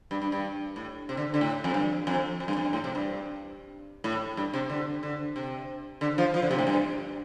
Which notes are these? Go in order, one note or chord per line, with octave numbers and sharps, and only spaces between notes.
G2
G2
G2
A2
C3
D3
D3
A2
F2
G2
F2
F2
G2
F2
G2
A2
C3
G2
A2
G2
C3
D3
D3
C3
D3
F3
F3
D3
C3
A2
G2